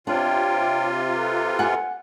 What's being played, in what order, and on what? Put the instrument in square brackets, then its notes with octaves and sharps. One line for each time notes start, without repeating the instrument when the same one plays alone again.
[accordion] C3 F4 [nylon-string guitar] D4 [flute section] C#5 G5
[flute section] A4 B4 A#5
[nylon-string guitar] F#5 G#5